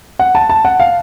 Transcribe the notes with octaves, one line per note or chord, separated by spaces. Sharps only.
F#5
A5
A5
F#5
F5